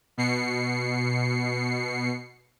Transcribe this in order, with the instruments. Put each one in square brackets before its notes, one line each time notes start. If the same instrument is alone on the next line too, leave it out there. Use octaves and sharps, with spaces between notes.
[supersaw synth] B2 C7 C#7